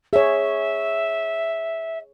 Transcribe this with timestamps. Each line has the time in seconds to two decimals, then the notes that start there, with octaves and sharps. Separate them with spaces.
0.13 G#4 C#5 E5